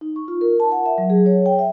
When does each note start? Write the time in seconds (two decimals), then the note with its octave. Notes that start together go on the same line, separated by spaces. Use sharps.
0.01 D#4
0.16 C#6
0.28 F4
0.41 A#4
0.60 A5
0.72 F#5
0.86 E5
0.98 F#3
1.10 G#4
1.26 C#5
1.46 G5
1.59 E5